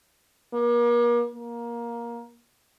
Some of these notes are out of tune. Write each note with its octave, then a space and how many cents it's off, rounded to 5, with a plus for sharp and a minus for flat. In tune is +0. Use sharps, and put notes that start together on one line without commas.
A#3 +40
A#3 +15